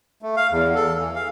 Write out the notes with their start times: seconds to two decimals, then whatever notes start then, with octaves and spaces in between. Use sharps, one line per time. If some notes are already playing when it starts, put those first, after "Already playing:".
0.22 A3
0.36 F5
0.51 E2
0.75 A4
0.98 E3
1.15 F5